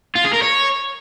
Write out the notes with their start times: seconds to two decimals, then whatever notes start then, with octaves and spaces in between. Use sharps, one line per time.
0.15 F4
0.24 G#4
0.33 A#4
0.42 C#5